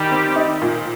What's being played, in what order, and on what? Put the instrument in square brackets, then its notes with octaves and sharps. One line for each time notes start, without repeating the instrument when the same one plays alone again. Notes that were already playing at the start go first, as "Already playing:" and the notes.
Already playing: [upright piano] D#3 [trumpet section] G3 G4
[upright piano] C4
D#4
A#2